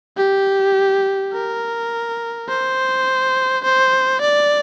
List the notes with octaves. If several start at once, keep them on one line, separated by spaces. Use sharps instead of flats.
G4
A#4
C5
C5
D5